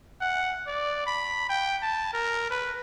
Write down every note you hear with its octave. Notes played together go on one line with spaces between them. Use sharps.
F#5
D5
B5
G5
A5
A#4
B4